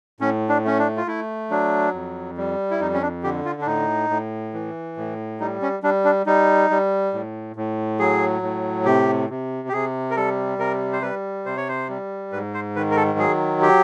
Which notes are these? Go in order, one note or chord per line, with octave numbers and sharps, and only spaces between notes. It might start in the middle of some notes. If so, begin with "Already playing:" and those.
A2 C#4
D4
A3 C#4
D4
F4
A3 E4
F#3 D4
F2
G3
E4
F2 D#4
C#4
D4
D3 G4
F4
D4
A2 D#4
A2
E3
A2
G3 D#4
C#4
G3 D4
D4
G3 D#4
G3
A2
A2
F#3 G#4
A2
C3 G4
C3
G4
C3 G#4
A#4
G3 A4
C3 A#4
C5
G3 B4
C3 C5
C#5
C5
G3
G#2 B4
C5
D#3 B4
A#4
A4
F#3 G#4
G4